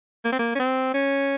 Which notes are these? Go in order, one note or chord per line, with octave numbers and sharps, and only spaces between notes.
A#3
C4
A#3
C#4
C4
C#4